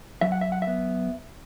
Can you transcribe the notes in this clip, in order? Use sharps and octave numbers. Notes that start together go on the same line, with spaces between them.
F#3 E5
F#5
E5
F#5
E5
B3